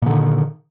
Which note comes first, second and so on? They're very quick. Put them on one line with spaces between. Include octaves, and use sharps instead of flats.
A#2 D3 D#3